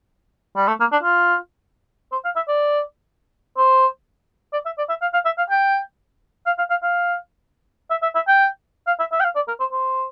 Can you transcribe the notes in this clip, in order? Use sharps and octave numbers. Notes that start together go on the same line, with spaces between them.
G3
A3
A#3
D4
F4
C5
F5
E5
D5
C5
D5
E5
D5
E5
F5
F5
E5
F5
G5
F5
F5
F5
F5
E5
E5
E5
G5
F5
E5
E5
G5
F5
D5
A#4
C5
C5